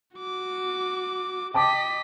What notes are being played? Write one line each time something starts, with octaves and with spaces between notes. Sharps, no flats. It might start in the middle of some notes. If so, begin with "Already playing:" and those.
F#4 D6
D#5 G5 A5 D6 B6